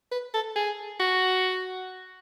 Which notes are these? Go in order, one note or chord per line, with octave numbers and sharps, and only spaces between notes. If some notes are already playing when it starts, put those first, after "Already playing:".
B4
A4
G#4
F#4